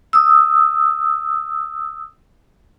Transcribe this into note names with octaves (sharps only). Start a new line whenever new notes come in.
D#6 E6